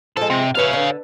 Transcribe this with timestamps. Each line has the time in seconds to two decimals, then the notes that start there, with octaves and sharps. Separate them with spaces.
0.17 F3 G#3 A4
0.30 C3
0.55 F#2 B4 C#5 E5 F5
0.73 D3